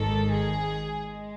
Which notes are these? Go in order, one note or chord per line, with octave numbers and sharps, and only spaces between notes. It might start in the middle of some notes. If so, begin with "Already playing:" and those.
Already playing: G#1 G#2 D#3 A4
G#4
G#3